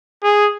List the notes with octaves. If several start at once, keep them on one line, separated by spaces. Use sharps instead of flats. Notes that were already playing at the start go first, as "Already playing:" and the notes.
G#4